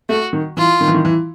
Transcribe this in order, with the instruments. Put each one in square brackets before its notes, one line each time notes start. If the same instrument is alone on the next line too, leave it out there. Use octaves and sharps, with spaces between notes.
[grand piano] A3 [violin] F#4
[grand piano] D#3
[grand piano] E3 [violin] F4
[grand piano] D#3
E3
D#3
E3